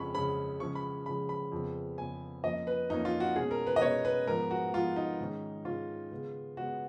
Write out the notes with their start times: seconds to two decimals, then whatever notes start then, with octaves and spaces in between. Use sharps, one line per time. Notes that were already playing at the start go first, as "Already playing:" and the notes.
Already playing: F2 C#3 G#3 C#4 B5 C#6
0.14 F2 C#3 G#3 C#4 B5
0.60 C#3 F3 G#3 C#4 C#6
0.75 B5
1.06 C#3 F3 G#3 C#4 B5
1.29 B5
1.52 F2 C#3 F3 B3
1.98 F2 C#3 F3 B3 G#5
2.44 F2 F3 A#3 C#4 D#5
2.67 B4
2.90 F2 F3 A#3 C#4 D#4
3.05 F4
3.20 F#4
3.36 B2 G#3 C#4 G#4
3.51 A#4
3.67 B4
3.76 D#5
3.82 B2 G#3 C#4 C#5
4.05 B4
4.27 G#2 F3 B3 A#4
4.51 F#4
4.73 G#2 F3 B3 F4
4.96 D#4
5.19 G#2 D#3 G#3 C#4
5.65 G#2 D#3 G#3 C#4 F4
6.11 C#3 G#3 B3
6.57 C#3 G#3 B3 F#4